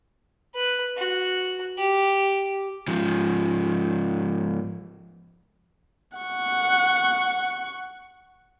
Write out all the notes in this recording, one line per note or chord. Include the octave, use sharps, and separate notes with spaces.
B4
F#4
G4
G#2 F3
F#5 C#6